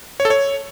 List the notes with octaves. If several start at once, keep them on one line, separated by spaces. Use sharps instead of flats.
C#5
A4
C#5